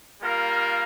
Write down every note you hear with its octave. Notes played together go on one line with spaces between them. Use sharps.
G3 A#3 F4 A#4 F5